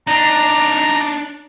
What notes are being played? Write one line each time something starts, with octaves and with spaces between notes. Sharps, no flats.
D4 D#4 A#5